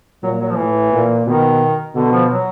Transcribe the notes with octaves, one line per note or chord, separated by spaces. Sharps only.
A#2 F#3
F#3
F3
A2 E3
A#2
B2 D#3
B2 D3
F3
F#3